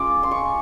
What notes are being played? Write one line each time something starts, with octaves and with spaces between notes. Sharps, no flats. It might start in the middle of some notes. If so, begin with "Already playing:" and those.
Already playing: G#3 C#4 F4 D6
C6
C#6